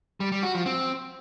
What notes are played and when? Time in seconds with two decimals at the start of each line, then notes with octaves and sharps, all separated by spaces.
0.20 G3
0.32 G3
0.43 F#4
0.54 F3
0.66 C4